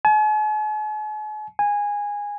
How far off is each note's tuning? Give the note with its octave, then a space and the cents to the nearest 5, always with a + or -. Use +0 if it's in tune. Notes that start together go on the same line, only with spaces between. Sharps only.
G#5 +45
G#5 -15